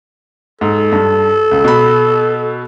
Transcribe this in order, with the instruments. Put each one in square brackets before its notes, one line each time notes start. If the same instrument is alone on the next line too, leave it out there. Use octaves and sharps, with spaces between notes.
[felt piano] G#2 [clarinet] A4
[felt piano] G2
C#2
B2 B5